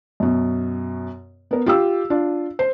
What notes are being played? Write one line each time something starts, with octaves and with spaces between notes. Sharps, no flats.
F#2 B2
B3 A#4
F4 G4 E6
D4 F4
C5